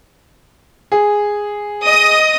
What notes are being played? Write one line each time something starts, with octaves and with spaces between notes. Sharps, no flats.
G#4
D#5 D#6